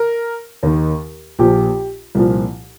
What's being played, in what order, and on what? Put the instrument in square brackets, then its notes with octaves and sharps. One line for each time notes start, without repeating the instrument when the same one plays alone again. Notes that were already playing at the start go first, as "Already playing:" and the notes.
Already playing: [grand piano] A#4
D#2 D#3
A#1 A#2 F3 G4
C2 A#2 F3